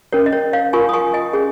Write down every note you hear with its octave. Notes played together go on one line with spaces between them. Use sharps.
C#4 A#4 C#5
D#5
C#5
C#5 F5
F4 A#4 C#5 G#5 C#6
D#6
G#5 C#6
D#5 G#5
C#4 G#4 C#5